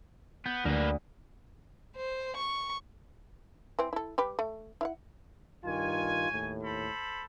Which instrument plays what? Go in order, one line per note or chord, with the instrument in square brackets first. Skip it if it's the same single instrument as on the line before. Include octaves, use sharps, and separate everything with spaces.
[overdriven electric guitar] B3 [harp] G6
[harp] D2 [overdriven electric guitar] A#3 B4
[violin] C5
C#6
[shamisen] E3 C4
E4 A4
G3 G4 B4
A3
E4 F5 F#5
[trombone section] G2 D#3 F4 [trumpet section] C#5 G#5
[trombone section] D#2 A2
[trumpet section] A4 C5 B5